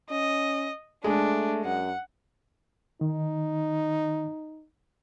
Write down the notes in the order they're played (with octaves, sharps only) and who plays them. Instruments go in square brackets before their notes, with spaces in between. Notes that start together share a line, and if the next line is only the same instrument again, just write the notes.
[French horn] C#4 [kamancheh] D#5
[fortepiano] G#3 [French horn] A3 [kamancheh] D4
[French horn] F#2 [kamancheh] F#5
[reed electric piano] D#3 [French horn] D#4